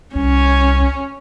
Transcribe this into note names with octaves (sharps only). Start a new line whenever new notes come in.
C2 C#4